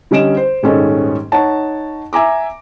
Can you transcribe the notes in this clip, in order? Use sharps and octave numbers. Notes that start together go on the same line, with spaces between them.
D3 G3 C#4 D#5 D7 E7
C5
D#1 G#2 D#3 C#4 A4 D#5
D#4 C#5 F#5 A5
E5 G#5 A#5 D6